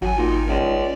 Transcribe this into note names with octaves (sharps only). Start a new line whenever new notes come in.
G#1 F#2 F#3 G#5
A#2 D#4
C#2 D5